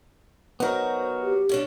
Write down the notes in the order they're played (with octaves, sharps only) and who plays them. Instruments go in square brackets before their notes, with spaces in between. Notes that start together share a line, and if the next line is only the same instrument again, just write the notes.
[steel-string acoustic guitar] F#3 F#4 [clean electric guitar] B3 D#4 A#4 [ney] C5
[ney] G4
[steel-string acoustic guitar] B2 C#4 D4